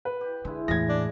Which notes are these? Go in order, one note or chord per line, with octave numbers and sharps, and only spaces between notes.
B4
G4
D3 G#3 E4
E2 A2 G#4 G#6 A#6
D4